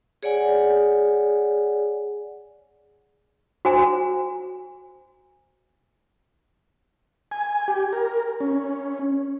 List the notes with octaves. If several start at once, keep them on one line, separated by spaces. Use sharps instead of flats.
G#4 C#5 D5 F#5 G#5
F#4 C5 G#5 A#5
G#5
G4
A#4
C#4